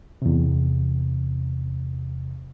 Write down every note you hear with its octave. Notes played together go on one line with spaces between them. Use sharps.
E2 C3